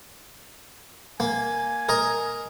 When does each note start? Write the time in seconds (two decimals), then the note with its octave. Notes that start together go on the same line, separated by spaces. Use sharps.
1.20 A#3 G#5
1.89 A#4 D#5 A#5